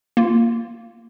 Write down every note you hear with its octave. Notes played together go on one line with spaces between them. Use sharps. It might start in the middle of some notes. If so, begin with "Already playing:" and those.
A#3 F4